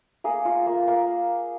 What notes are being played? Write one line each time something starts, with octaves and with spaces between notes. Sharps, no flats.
A#3 G#4
F4
A#3
A#3